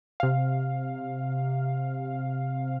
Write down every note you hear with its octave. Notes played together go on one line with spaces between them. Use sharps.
C3 F5